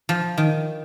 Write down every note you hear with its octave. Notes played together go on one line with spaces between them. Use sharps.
F3
D#3